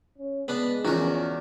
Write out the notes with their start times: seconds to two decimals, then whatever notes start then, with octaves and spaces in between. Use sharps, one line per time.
0.18 C#4
0.48 G#3 B3 D4
0.85 E2 F3 C#4 F#4 A#4